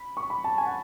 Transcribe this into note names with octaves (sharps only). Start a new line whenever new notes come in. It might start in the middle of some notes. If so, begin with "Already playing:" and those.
Already playing: B5
C#6
B5
A5
G#5
F#5